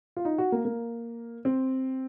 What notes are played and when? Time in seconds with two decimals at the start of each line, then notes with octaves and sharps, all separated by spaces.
0.17 F4
0.25 D#4
0.38 F#4
0.52 A#3
0.65 A#3
1.45 C4